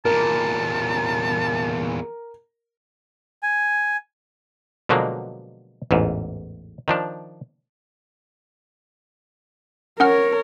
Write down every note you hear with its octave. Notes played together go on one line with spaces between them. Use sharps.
E2 A#2 A#4 A5
G#5
B2 D3 F3 F#3 G#3 A#3
A1 E2 G#2
D#3 F3 D4
C#4 A#4 C#5 F#5 F6